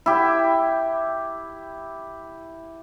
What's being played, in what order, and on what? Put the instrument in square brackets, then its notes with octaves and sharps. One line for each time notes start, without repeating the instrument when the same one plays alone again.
[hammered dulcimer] E4 G4